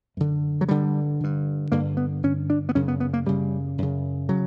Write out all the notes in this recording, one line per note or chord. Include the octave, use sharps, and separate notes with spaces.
F#2 D3
F#3
G2 D3 G3
G2 D3
G2 D3 A#3
B3
G2 D3 C#4
D4
B3
F#2 C#3 C#4
B3
B3
A#3
F#2 C#3 G3
F#2 C#3
C#3 F#3